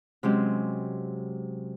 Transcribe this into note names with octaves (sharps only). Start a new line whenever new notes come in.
C3 F#3 G#3 C#4 G4